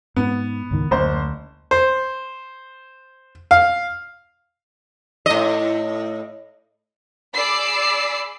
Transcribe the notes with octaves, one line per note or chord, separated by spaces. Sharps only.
G#2 B3
C#2 G#2 D#3
F#1 D2 C5
C5
F5
A2 D#5
G#4 D5 B5 D6 E6 C7